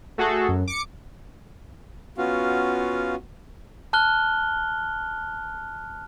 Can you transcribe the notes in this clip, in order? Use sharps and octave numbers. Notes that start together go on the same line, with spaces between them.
A3 F#4 G#4 A4
F#2
D6 C#7
B3 C#4 F4 F#4 F5
A5 F6 F#6 G7